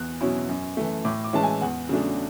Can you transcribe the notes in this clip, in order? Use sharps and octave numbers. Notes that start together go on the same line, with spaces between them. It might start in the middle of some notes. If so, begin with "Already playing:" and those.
Already playing: E2 F#6
B2 F#3 C#4 E4
F#2
E3 A3
A2 D6
D6
E3 G#3 C#4 E4 A5
G#5
E2 F#5
C#3 F#3 A3 D4